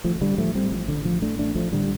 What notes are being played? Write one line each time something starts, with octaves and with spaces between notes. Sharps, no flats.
A1 F3 A3
F3
D3 G3
A2 F3 A3
G3 C4
A1 F3
D3
A2 F3
A3 D4
A1 A3 D4
F3 A3
A2 D3 G3